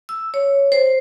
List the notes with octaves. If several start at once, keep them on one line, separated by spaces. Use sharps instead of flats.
E6
C#5
C5